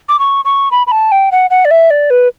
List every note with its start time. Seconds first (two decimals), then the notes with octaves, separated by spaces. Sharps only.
0.09 D6
0.19 C#6
0.45 C#6
0.71 B5
0.87 B5
0.92 A5
1.12 G5
1.32 F#5
1.50 F#5
1.65 D5
1.71 E5
1.90 D5
2.10 B4